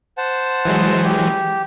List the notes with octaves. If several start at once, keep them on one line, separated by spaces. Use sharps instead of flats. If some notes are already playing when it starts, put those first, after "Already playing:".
C5 F#5 A5
E3 F#3 G#3
G4